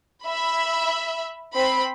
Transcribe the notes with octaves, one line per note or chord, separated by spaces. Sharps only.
E5 B5
C4 B5